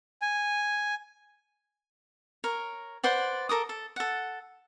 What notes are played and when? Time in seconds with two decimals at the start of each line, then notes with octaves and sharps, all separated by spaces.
0.22 G#5
2.44 A#4 C#5
3.03 B4 C5 D5 F#5
3.49 A4 A#4 D6 D#6
3.69 A4
3.96 A4 F#5